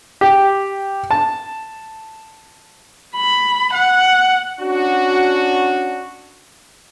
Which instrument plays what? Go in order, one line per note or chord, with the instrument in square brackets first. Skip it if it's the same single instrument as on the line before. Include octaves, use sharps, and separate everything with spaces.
[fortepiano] G4
A5
[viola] B5
F#5
[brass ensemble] C#4 D4 F#4